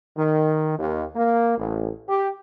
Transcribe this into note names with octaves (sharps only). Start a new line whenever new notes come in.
D#3
D#2
A#3
A1
G4